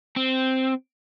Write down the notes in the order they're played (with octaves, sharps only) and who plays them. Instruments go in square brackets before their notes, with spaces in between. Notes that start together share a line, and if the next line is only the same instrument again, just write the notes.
[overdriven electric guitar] C4